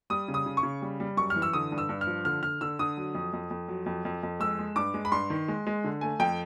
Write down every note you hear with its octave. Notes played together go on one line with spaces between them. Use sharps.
G3 D#6
C#3
D#6
C#3
C#6
C#3
G3
G3
F#2 C#6
F6
E3
E6
D3 D#6
G2
E6
G2
F6
F3
D3 F6
D3 F6
D3 E6
D3 D#6
F#3
F2
F2
F2
F#3
F2
F2
F2
G#3 E6
G#3
G2 D6
G#3
B5
G2 C6
D#3
G#3
G#3
D3
A3 G#5
F2 G5